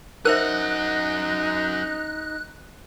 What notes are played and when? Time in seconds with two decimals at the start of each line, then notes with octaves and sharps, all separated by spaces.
0.25 F#2 D#4 A#4 C5 E5 F#5 F#6